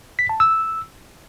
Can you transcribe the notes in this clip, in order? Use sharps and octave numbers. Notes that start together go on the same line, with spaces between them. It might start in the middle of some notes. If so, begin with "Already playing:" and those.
B6
A5
E6